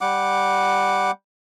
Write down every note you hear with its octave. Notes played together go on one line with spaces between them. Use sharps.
G3 F#5 D6